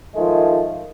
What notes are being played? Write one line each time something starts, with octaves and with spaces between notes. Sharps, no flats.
D#3 F3 G#3 A3